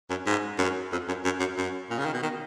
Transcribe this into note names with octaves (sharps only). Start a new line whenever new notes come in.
F#2
G#2
F#2
F2
F#2
F#2
F#2
F#2
A#2
C#3
D#3
B2
D#3